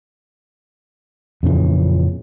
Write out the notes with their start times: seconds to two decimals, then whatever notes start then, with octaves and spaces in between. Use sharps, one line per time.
1.43 F2 A#2 C#3 E3